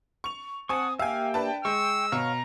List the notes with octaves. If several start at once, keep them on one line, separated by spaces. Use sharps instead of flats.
C#6 F7
C4 F#5 G#5 A5 C#6 D#6
A#3 G4 E5 F5 G5 G#5
D4 B4 A5
G#3 C#6 E6
B2 C#5 F5 A#5